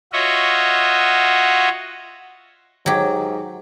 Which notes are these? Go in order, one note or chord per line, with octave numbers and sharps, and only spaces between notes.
F4 F#4 C#5 D#5 E5 F#5
G#2 F#3 G4